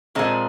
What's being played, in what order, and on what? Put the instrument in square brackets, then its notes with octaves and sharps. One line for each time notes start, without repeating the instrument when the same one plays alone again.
[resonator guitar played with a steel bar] A#2 F3 G#3 C4